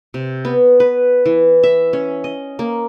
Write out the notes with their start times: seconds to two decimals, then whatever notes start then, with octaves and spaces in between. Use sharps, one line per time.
0.14 C3
0.45 B3
0.80 B4
1.26 E3
1.63 E5
1.93 C#4
2.24 D#5
2.59 A#3